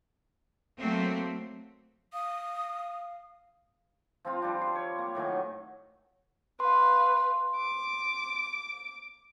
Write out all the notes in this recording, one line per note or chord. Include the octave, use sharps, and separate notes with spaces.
F#3 A3 A#3 C4
F5 D#6
F3 C4 F4
F3 G3 D4
C6
C#5
A#3
A2 D#3 F#3 G#5
B4 F5 C6
D6